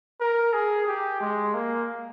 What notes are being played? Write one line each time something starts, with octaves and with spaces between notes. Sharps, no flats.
A#4
G#4
G4
G#3
A#3